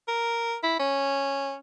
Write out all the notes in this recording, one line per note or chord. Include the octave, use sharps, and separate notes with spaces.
A#4
E4
C#4